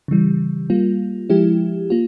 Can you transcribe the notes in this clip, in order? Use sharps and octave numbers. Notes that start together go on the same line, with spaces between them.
C#3 E3 G3
G3 A#3 F4
F3 G#3 E4 G4
A#3 F4